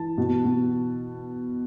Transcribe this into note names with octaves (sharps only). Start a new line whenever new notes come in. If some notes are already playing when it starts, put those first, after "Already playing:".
Already playing: E3 A5
B2
B2